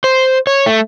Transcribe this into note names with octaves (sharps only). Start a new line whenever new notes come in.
C5
C#5
A3